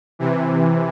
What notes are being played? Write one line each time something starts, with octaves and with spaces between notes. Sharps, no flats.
C3 E3